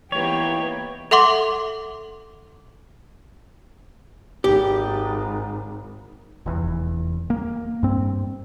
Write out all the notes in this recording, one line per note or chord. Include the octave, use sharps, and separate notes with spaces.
E3 A#3 B3 D#4 G4 C#5 G5
A4 E5 F#5 C6 D6
G#1 G4
F1 E2
A#3
G2 C4